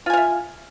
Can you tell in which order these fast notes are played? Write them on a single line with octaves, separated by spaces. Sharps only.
F4 G#5 F5 E5